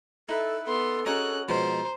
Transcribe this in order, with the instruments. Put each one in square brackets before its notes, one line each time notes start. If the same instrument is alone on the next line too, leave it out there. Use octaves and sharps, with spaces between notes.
[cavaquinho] D#4 B4 E5 [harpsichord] E4 [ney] A4
[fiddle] B3 C6 [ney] A4
[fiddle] C#4 F#6 [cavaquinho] F#4 A#4 C#5 [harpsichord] G#4 D#5
[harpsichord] B2 F3 G#3 [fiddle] C5 [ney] A#5